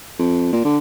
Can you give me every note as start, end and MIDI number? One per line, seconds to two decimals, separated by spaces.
0.19 0.50 41
0.53 0.63 46
0.65 0.78 50